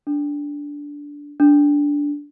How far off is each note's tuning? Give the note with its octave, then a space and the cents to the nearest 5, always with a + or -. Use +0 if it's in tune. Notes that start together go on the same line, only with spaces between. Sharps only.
D4 -15
D4 -15